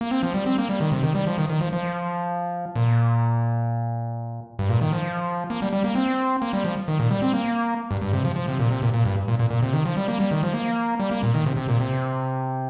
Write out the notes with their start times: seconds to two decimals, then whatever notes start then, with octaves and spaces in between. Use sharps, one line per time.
0.01 A#3
0.11 C4
0.23 F3
0.34 G3
0.46 C4
0.58 A#3
0.69 G3
0.80 D#3
0.92 C3
1.03 D#3
1.15 G3
1.27 F3
1.38 D#3
1.50 D#3
1.61 F3
1.73 F3
2.76 A#2
4.59 G2
4.69 A#2
4.81 D#3
4.92 F3
5.50 A#3
5.62 G3
5.73 G3
5.84 A#3
5.95 C4
6.42 A#3
6.53 G3
6.65 F3
6.88 D#3
6.99 A#2
7.11 G3
7.22 C4
7.33 A#3
7.91 G2
8.02 G2
8.13 C3
8.25 F3
8.36 F3
8.48 C3
8.59 A#2
8.71 C3
8.82 A#2
8.94 A#2
9.05 G2
9.28 A#2
9.39 A#2
9.50 A#2
9.63 C3
9.73 D#3
9.86 F3
9.97 G3
10.08 A#3
10.20 G3
10.31 D#3
10.43 F3
10.54 A#3
11.00 G3
11.11 A#3
11.23 A#2
11.34 D#3
11.46 C3
11.57 C3
11.68 A#2
11.80 C3